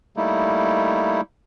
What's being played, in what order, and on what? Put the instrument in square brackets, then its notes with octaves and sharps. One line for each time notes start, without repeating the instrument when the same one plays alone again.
[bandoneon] G3 A3 A#3 D#4 E4